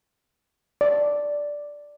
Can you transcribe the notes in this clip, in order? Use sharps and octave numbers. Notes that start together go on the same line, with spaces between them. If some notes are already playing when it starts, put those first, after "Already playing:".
D5